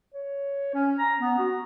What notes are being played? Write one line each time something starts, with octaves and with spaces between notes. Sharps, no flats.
C#5
C#4
A#5
B3
F#4